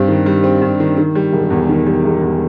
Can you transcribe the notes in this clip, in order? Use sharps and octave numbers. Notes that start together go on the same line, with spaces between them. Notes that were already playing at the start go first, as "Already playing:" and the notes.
Already playing: G2 G3 C4
D#3
G3
C4
G2
D#3
D#3
G3
E1
E2
D#3
G3
E1
E2